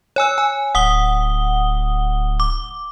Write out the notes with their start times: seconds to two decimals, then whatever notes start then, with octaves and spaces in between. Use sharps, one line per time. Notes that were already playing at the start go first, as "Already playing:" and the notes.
0.16 C#5 G#5 E6
0.38 G#5
0.75 D1 F#5 D#6 G7
2.40 D6